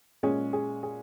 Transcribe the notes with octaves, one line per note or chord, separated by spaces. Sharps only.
A#2 G#3 C#4 G#4
G#4
G#4